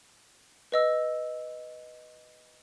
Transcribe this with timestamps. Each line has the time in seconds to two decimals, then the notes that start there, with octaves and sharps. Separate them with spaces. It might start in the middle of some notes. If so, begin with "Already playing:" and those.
0.72 B4 D#5 E6